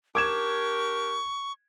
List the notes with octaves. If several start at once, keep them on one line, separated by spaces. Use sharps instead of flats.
D4 G4 A#4 C#6 D6 G#6 E7